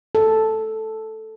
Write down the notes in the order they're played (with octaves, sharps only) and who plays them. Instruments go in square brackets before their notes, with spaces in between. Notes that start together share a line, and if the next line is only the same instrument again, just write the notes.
[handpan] A4